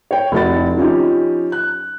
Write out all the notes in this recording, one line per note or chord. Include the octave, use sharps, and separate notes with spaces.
C#5 G5
F1 E4 F#4 A6
F3 C#4 D#4 G4
F#6